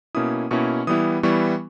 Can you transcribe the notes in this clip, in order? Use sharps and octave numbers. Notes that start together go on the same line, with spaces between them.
B2 A#3 C#4 E4 D#6
B2 A#3 C#4 E4 C#6
E3 G3 B3 E4 D#6
E3 G3 B3 E4 C#6